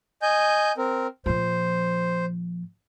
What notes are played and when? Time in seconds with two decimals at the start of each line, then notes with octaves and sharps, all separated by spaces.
0.22 D#5 G#5 G6
0.78 C4 A#4
1.26 A#2 F3 C5